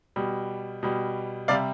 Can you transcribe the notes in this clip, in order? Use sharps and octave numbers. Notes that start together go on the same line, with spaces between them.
B2 G3
B2 G3
C3 G3 D5 F5